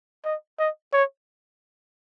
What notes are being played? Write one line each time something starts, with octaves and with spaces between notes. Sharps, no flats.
D#5
D#5
C#5